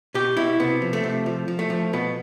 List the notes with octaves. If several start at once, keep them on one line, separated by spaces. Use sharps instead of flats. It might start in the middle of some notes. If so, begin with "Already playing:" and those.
B2 G4
B2 E4
C3 B3
F3
A3
C3
F3
F3
A3
F3
B2 B3